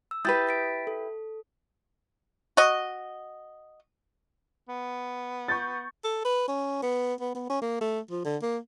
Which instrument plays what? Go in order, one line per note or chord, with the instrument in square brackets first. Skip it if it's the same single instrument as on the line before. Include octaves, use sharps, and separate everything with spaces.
[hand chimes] E6
[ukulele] E4 G4 B4 [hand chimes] D#6 G6 A6
[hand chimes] A6 B6 D7
A4
[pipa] F#4 D#5
[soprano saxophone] B3
[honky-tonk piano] C#6 G6 A6
[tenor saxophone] A4
B4
C#4
B3
B3
B3
C#4
A#3
A3
F3
D3
A#3